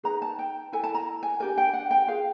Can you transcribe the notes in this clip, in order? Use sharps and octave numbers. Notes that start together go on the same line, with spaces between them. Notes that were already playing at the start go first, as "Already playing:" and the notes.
D#4 G#4 B4 A#5
A5
G5
E4 A4 G#5
A5
A#5
G#5
D4 G4 A#4 G#5
G5
F#5
G5
F4 G#4 B4 F5